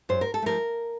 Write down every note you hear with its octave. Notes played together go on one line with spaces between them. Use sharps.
F#2 C5
A#4
A4
F3 A3 A#4